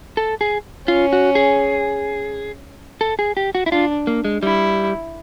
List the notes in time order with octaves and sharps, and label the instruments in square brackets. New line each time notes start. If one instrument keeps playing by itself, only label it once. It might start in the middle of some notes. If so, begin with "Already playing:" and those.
[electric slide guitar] A4
G#4
[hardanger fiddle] C#4 [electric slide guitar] F4
[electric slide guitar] F#4
G#4
A4
G#4
G4
F#4
E4
[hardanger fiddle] D4 [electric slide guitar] F4
[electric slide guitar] A#3
G#3
[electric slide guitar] G3 [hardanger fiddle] E4